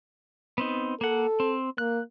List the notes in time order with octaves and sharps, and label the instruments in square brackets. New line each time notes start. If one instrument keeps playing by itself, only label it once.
[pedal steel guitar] B3 C4 D#4
[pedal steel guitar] A#3 F#5 [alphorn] A4
[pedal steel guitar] C4
[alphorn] A#3 [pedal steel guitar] F#6